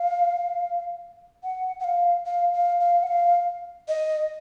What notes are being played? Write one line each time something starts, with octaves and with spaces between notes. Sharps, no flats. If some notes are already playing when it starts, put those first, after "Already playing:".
Already playing: F5
F#5
F#5
F5
F5
F5
F5
F#5
F5
D#5